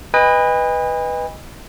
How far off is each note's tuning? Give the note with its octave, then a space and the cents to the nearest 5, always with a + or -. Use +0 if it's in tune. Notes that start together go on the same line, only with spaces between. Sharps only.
B4 +0 D#5 +0 G#5 -45